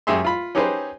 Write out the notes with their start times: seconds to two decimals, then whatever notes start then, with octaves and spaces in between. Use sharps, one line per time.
0.07 F#2 G4 G#4 E5 C6
0.25 F4 B5
0.55 C#4 D#4 G4 G#4 B4 C5